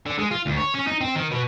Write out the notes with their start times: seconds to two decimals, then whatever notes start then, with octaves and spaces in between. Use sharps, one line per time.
0.06 D3
0.18 G#3
0.31 F4
0.46 D2
0.57 C#5
0.75 C#4
0.87 D#4
1.01 C4
1.15 D#3
1.31 B2